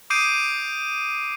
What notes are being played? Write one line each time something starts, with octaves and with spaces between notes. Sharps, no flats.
D6 D#6 G6 C7 D7 D#7